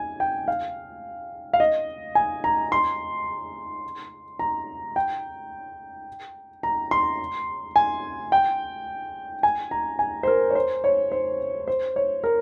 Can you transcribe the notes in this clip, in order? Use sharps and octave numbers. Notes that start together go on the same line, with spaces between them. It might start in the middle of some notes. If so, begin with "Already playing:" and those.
Already playing: G#5
G5
F5
F5
D#5
G#5
A#5
C6
A#5
G5
A#5
C6
G#5
G5
G#5
A#5
G#5
C5
A#4
C#5
C5
C#5
C5
C5
C#5
A#4